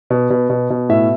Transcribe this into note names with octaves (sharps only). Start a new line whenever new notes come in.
B2
B2
B2
B2
A2 E5